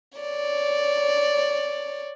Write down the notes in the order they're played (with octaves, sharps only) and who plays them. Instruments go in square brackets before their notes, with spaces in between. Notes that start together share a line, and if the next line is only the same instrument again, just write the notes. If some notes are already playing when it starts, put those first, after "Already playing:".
[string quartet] C#5 D5